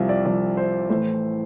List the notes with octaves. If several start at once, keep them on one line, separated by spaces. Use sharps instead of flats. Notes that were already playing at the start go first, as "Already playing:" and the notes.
Already playing: C2 C3 F3 E5 F5
D5
C2 C3 F3 D5
C5
A2 E3 A3 C5